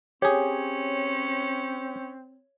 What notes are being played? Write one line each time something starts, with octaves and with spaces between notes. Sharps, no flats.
C4 C#4 G4 G#4 C#5